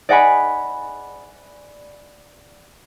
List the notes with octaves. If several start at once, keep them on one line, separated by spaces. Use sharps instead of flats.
D5 D#5 F#5 G#5 B5